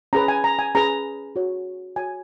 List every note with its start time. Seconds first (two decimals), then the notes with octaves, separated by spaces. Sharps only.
0.13 C#4 G#4 B4 A#5
0.28 G#5
0.44 A#5
0.59 G#5
0.75 C#4 G#4 B4 A#5
1.36 F#4 C#5
1.96 F#4 C#5 G#5